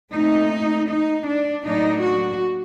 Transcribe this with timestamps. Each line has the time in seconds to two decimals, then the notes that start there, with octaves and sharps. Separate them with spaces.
0.12 A#2 A3 C4 D#4
0.90 D#4
1.27 D4
1.66 A2 F#3 A#3 D4 D#4
2.03 F#4